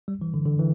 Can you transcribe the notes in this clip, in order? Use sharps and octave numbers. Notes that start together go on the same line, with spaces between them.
G3
E3
D3
D3
E3